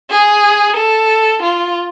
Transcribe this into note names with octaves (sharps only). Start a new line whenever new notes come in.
G#4
A4
F4